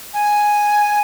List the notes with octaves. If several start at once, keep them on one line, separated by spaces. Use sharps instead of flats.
G#5